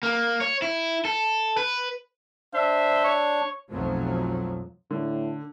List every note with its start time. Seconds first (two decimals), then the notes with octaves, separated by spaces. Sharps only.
0.03 A#3
0.41 C#5
0.62 E4
1.05 A4
1.57 B4
2.54 D4 C5 E5
3.04 C#5
3.70 B1 F2 F3 F#3 A3
4.91 A2 D3